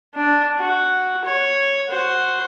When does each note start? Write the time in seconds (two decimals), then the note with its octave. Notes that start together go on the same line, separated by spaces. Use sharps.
0.15 D4
0.58 F#4
1.24 C#5
1.89 F#4 C5